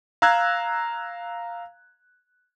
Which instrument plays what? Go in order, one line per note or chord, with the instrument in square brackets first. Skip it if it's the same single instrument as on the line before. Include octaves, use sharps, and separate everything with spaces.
[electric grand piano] F5 A#5 E6 F#6 G#6